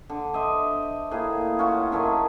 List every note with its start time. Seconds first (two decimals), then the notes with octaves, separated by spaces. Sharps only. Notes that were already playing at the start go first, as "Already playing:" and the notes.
0.09 D3
0.34 C5 D#5 E5 D6
1.11 A2 A#3 G#4
1.59 C#4 F4 F#4
1.92 F#2 D#3 A3 G#5